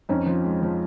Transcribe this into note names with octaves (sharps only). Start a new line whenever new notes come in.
F2 C#4 D#4
F3
G#3
F3